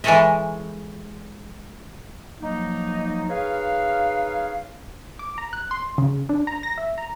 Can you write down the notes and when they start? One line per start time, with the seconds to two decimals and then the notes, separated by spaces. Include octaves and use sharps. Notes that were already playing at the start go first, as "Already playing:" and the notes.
0.04 E3 G#3 A4 C#5 D#5 E5
2.41 F3 F#3 A#3 D#4
3.30 D#4 G#4 B4 C#5 F5
5.19 D6
5.38 A#5
5.53 F#6
5.71 C6
5.98 C#3
6.29 D4
6.47 A#5
6.63 A#6
6.78 E5
6.98 A#5